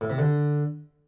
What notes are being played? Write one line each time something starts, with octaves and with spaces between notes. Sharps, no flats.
A2
C3
D3